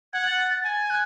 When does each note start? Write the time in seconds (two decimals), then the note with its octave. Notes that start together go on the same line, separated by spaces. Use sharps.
0.13 F#5 G#6
0.26 A6
0.39 A6
0.51 A6
0.64 G#5 A6
0.85 G#6
0.90 F#6